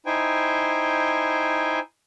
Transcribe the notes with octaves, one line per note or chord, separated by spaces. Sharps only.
D#4 E4 C5 G5 G#5